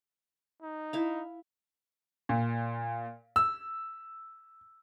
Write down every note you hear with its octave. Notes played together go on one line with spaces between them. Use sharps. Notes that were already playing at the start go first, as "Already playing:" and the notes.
D#4
E4 F5
A#2
E6